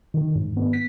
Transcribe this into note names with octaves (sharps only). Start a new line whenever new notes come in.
D#3
G#2
B3
B6